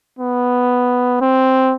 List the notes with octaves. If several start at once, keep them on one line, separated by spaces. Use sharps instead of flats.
B3
C4